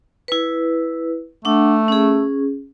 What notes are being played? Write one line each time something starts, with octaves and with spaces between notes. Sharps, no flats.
E4 B4
A3 D4 F#5
C#4 G#4